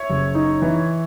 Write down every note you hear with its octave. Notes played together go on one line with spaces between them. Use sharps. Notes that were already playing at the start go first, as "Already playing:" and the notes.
Already playing: C#5 E5
F#1
D#4
E3